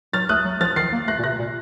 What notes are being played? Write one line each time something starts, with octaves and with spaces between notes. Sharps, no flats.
F#3 F6 A6
A3 D#6 F#6
F#3
F3 F6 A6
D#3 A6 C7
A#3
A3 F#6 A#6
A#2
C3 F#6 A#6
A#2